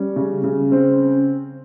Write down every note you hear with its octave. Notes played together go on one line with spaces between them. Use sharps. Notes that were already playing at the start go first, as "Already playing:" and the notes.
Already playing: G3 C#4
C#3
C#3
C4